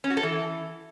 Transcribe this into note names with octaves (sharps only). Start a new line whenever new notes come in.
C#4
F#4
A4
E3